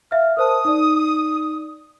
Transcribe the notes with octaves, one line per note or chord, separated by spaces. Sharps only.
E5 F5 F6
A#4 C5 A5 D#6
D#4 D5